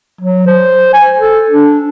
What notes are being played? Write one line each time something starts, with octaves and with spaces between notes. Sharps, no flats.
F#3
C5
G#5
A4
D4